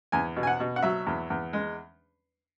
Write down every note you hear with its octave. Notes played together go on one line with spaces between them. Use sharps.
E2 G#5
B2
G#5
F#5
B2
F#5
F#3 E5
E2
E2
G#3